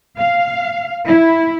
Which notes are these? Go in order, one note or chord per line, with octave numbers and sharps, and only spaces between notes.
F5
E4